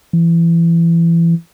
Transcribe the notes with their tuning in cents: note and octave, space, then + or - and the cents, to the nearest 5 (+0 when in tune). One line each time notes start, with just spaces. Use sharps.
E3 +25